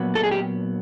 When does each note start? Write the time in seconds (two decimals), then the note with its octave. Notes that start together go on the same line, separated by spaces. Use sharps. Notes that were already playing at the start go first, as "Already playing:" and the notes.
Already playing: A#2 F#3 B3
0.15 A4
0.23 G#4
0.31 G4